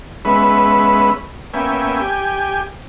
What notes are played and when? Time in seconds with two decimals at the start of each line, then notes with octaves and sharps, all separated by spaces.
0.25 G#3 B3 C#4 B4 E5 B5
1.54 A#3 B3 C#4 E5 G5 G#5
2.00 G4 G5 G#5